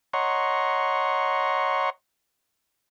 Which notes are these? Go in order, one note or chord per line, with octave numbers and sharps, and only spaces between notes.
C#5 D#5 F#5 A#5 C6 C#6